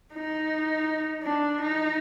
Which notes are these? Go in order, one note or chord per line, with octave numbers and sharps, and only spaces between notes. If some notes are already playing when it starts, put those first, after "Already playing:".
D#4
D4
D#4